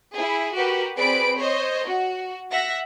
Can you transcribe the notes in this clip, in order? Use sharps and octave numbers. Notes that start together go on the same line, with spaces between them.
E4 G#4
F#4 G4 A#4 B4
C4 G#4 B4 D5 B5 D7
C5 C#5 D#5
F#4
E5 F#5 A#6